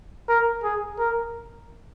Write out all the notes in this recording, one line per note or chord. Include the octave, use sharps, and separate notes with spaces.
A#4
G#4
A#4